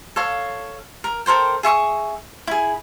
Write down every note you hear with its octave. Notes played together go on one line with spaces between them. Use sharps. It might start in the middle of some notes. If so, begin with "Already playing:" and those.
A4 C#5 F5
A#4
A4 A#4 C5 G5
G#4 E5 C#6 D#6
E4 G#4